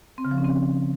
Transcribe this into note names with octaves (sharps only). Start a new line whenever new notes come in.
C4
C#3
F3
C#4
C4